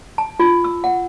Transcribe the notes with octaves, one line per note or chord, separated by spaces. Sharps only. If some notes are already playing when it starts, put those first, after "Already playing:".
A5
F4
E6
F#5